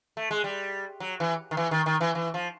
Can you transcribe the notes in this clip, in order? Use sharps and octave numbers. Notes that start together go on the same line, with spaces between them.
A3
G#3
G3
F#3
E3
D#3
E3
D#3
D#3
E3
E3
F3